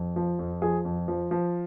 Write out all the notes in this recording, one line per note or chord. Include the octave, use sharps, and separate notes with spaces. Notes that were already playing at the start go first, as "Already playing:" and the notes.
Already playing: F2
F3
F2
F3 G#4
F2
F3
F3